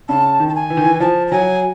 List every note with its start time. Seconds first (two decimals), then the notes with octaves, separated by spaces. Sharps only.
0.09 C#3 A5
0.40 D#3
0.48 A5
0.55 G#5
0.70 E3
0.77 D#3
0.84 E3
1.00 F3 A5
1.27 A5
1.32 F#3 G#5